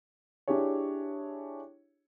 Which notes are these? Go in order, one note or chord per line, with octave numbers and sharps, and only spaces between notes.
D4 E4 G4 G#4 C#5